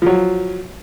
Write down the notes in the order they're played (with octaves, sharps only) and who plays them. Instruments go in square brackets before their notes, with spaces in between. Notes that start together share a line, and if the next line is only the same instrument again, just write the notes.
[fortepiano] F3 F#3